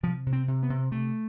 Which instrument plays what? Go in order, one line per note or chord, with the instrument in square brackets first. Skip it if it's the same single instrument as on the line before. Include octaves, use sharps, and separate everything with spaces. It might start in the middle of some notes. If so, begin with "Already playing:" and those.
[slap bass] C3 F3
C3
C4
C3
B3
C3
C3 A3